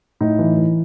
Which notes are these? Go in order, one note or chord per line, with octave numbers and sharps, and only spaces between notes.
A2 D#4
E3
E3